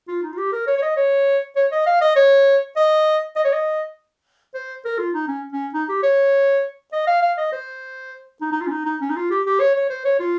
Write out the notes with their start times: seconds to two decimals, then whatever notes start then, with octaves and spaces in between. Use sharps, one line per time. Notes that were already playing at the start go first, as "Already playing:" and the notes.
0.08 F4
0.23 D#4
0.32 F4
0.38 G4
0.52 A#4
0.67 C#5
0.77 C#5
0.82 D#5
0.97 C#5
1.56 C#5
1.72 D#5
1.86 F5
2.01 D#5
2.16 C#5
2.76 D#5
3.36 D#5
3.44 C#5
3.53 D#5
4.54 C5
4.85 A#4
4.98 F4
5.14 D#4
5.28 C#4
5.53 C#4
5.74 D#4
5.89 G4
6.03 C#5
6.93 D#5
7.07 F5
7.22 F5
7.37 D#5
7.52 C5
8.41 D#4
8.52 D#4
8.61 F4
8.67 C#4
8.71 D#4
8.86 D#4
9.01 C#4
9.10 D#4
9.16 F4
9.31 G4
9.46 G4
9.60 C#5
9.75 C#5
9.90 C5
10.05 C#5
10.20 F4